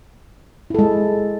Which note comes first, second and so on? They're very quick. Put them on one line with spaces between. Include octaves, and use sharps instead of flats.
E4 A4 G#3